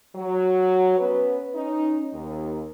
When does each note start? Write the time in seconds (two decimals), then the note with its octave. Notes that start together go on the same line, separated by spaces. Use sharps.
0.16 F#3
0.98 B3 C#4 B4
1.55 C#4 D#4
2.14 D#2